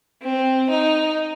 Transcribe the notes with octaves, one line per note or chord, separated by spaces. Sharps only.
C4
D#4